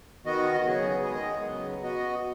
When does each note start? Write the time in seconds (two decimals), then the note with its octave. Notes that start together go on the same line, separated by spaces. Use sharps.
0.24 D#3 B3 F#4 D#5
0.63 C#3 F#3 B3 G#4
1.03 D#3 G#3 B3 G#4 D#5
1.43 C#3 F#3 B3
1.83 B3 F#4 D#5